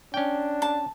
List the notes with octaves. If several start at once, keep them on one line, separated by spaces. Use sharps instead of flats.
C#4 D4 G5
A5